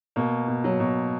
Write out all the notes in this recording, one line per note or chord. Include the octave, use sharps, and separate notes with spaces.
B2 A#3
B2
F#3
B2